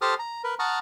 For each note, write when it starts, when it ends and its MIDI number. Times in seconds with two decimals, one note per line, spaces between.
0.01 0.14 67
0.01 0.14 69
0.01 0.14 72
0.01 0.14 81
0.01 0.14 87
0.01 0.14 89
0.19 0.42 82
0.44 0.55 70
0.44 0.55 71
0.59 0.79 78
0.59 0.79 81
0.59 0.79 82
0.59 0.79 85
0.59 0.79 87
0.59 0.79 89